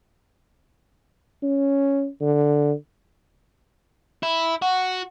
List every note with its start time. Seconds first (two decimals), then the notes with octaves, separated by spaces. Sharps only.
1.42 C#4
2.21 D3
4.23 E4
4.62 F#4